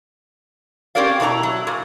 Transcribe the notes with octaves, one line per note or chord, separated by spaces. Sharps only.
C4 C#4 G4 A#4 D5 F5
B2 E4 C5 A#5
F#3
A#2